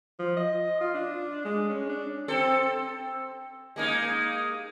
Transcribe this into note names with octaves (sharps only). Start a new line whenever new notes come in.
F3
D#5
F4
D4
G#3
C#4
D4
C4 A4
G#3 A#3 D#4